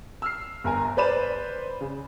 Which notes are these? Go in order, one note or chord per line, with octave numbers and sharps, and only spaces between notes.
E6 F6 C7
G1 A#4 G#5 A#5
B4 C5 D5 B5 D#7 E7
C#3